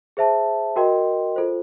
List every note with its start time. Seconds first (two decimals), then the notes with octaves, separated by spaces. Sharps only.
0.17 G#4 C5 E5 A5
0.76 F#4 A#4 D#5 G5 C6
1.36 F4 A4 C5